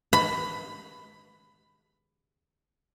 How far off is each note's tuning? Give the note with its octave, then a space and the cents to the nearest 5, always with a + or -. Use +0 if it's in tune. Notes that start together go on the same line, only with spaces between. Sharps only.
B5 +15